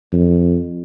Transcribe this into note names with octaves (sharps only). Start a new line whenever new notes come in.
F2